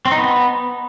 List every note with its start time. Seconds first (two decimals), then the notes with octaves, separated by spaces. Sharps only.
0.06 C4
0.12 D#4
0.18 B3